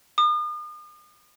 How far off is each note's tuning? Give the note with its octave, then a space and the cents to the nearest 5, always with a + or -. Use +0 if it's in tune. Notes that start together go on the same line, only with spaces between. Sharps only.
D#6 -45